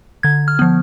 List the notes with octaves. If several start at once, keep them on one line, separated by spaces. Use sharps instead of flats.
D3 G#6
F6
F3 B3